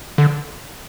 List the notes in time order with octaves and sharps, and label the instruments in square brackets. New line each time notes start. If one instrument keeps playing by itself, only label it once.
[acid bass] D3